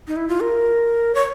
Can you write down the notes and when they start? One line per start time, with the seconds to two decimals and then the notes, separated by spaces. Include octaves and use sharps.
0.07 D#4
0.16 E4
0.28 F4
0.40 A#4
1.15 C#5